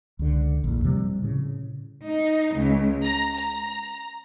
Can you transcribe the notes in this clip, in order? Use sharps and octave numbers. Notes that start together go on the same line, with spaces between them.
C#2 D3
A#1 E2
C3 F3 G3
A2 C#3
D#4
C#2
A#5
A#5